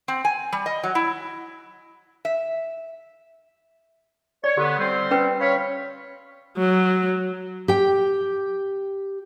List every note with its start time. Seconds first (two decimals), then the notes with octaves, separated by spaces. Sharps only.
0.08 C4
0.25 G#5
0.53 G3
0.66 D#5
0.83 F#3
0.95 E4
2.25 E5
4.44 C#5 D5
4.57 D3 B3 G4
4.79 G3 C4 C5
5.11 C#4 B4 G5
5.40 C#5 F5 B5
6.57 F#3
7.68 G4 G5